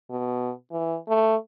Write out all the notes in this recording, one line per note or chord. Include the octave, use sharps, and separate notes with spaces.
B2
E3
A3